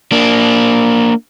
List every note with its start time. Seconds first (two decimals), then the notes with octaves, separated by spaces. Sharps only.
0.12 A#3 D4